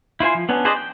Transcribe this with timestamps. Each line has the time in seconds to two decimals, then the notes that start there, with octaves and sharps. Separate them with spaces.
0.20 E4 F4 C5 G#5
0.35 F3
0.49 B3 C#4 D4
0.65 G#4 B4 C5 D5 D#5
0.76 G5